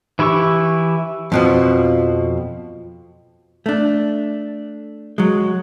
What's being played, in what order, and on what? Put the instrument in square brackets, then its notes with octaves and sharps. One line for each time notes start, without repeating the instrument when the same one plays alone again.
[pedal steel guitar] E3 E4 G4 C#6
[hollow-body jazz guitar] F2 B2 F3
A3 D4
F#3 G#3